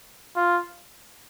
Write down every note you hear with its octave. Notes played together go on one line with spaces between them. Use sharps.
F4